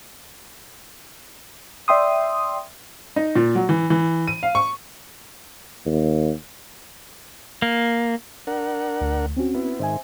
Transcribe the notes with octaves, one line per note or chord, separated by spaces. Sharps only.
D5 E5 G5 C6 D#6
D#4
A#2
F#3
E3
E3
D#7
F5
C#6
D#2
A#3
D4 A#4 F#5
D2
C4 C#4 F#4
B3 E4
G#2 D#3 C5 E5 G#5